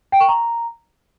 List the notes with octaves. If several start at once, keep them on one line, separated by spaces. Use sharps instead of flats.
G5
C#6
A#5